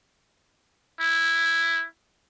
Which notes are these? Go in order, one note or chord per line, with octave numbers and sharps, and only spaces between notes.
E4